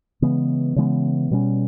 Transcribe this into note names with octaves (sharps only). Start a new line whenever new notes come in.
C#3 E3 G#3 B3
C#3 E3 G#3 B3
B2 G3 C#4